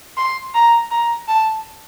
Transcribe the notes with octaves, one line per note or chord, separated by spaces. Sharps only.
C6
A#5
A#5
A5